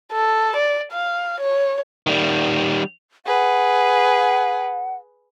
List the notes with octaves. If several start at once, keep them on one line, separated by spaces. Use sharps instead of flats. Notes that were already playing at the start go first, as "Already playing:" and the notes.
A4
D5
F5
C#5
D#3 G3
G#4 B4 F#5